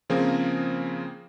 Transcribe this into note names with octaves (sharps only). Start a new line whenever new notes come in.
C#3 F3 A#3 C4 G#4 A#4